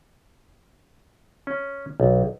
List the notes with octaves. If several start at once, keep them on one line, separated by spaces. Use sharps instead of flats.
C#4
B1